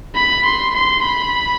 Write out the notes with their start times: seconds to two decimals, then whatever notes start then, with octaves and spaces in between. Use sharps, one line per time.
0.15 B5
0.45 C6
0.74 C6
1.02 B5